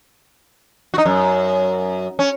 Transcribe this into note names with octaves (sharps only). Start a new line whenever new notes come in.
D#4 F#4
F#2
C#4